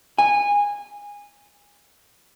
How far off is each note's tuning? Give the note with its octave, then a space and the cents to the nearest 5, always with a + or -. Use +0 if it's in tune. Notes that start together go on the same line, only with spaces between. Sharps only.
G#5 -20